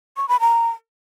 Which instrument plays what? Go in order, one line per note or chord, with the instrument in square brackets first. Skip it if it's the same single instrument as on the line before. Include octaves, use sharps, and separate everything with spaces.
[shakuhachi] C#6
B5
A#5